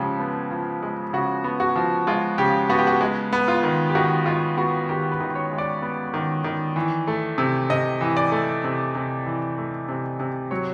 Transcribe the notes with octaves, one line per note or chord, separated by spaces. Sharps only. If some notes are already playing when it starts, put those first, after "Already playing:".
Already playing: C#3 F3 G#3 G4 A4
B3
F3
G#3
C#3 F#4
B3
F#4
F3
G#3 F4
C#3 G4
B3 F#4
G4
F#4
G#3
B3
F4
D#3
G4
D#3 F#4
G#3 F4
B3 F#4
D#3 G4
B4
D#3
C#5
G#3
D5
B3
D#3
D#3
E3
A3
C3
C3 D#5
E3
D5
A3
C3
C3
E3
A3
C3
C3
F#3 C#5